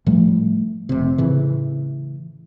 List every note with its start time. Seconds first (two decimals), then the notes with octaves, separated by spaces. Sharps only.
0.06 A2 F3 G3 A3
0.89 F1 C3
1.18 A2 C#3 E3